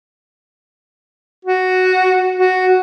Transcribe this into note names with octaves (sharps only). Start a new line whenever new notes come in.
F#4
F#4